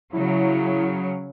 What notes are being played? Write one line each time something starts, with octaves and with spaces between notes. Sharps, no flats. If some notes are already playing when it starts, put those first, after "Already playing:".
C#3 F#3 E4